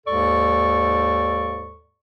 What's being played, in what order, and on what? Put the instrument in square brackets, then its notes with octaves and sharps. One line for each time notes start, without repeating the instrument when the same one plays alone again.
[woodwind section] D#2 G#2 G#3 A4 D5 C#6